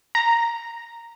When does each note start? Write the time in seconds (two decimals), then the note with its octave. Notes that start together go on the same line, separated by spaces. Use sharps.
0.15 A#5